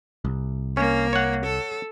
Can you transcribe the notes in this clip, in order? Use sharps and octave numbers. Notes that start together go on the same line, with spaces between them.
C2
A#3 C#4
C#5 F#5
A4